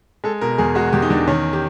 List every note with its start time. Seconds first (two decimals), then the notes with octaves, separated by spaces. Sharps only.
0.24 G#3 A4
0.41 B2 A#4
0.58 E2 G#4
0.75 G#3 F#4
0.93 E2 G4
1.02 D#4
1.10 E2 D4
1.27 D#3 C#4
1.53 G4